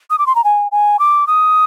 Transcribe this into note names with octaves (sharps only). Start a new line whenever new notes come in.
D#6
D6
C6
A#5
G#5
G#5
D6
D#6